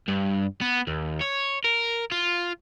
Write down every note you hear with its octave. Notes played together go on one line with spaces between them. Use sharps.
G2
B3
D#2
C#5
A#4
F4